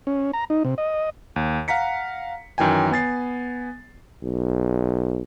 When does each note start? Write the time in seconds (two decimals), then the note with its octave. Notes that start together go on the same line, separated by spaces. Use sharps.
0.07 C#4
0.33 A#5
0.50 D#4
0.65 C3
0.78 D#5
1.36 D#2
1.68 F5 F#5 A#5 B6 C#7
2.58 F#2 D#3 E3 G5 G#5
2.91 B3 G#5 A6 C7
4.23 B1